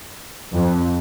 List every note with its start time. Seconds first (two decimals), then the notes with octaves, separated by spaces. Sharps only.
0.54 F2